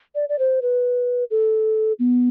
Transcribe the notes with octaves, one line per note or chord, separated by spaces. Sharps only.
D5
D5
C5
B4
A4
B3